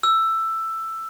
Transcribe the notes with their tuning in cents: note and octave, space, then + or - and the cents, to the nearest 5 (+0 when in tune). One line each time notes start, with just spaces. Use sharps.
E6 +10